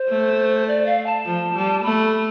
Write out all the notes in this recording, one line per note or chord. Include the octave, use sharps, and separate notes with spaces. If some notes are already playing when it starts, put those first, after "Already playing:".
Already playing: C5
A3
D5
F5
A5
F3
G3
A3 B5